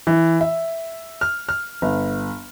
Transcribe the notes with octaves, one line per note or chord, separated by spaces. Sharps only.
E3
E5
F6
F6
G1